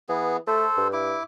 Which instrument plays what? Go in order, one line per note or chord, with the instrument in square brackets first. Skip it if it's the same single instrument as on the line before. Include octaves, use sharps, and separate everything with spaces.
[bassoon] E3 [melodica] B3 G#4
[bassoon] A3 [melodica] A4 C5
[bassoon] G2
[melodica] E4 D6